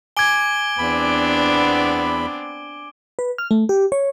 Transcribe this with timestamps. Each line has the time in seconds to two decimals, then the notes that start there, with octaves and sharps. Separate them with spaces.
0.17 G#5 D6 G#6 D7 G7
0.78 E2 B3 C4 D4 B5
3.19 B4
3.38 F6
3.51 A3
3.69 G4
3.92 C#5